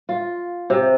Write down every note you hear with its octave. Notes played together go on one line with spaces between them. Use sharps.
F4
C3